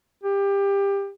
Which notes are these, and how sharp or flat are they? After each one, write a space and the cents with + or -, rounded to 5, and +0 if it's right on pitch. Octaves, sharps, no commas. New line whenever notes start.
G4 +20